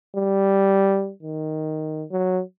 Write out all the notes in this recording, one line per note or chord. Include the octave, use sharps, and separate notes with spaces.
G3
D#3
F#3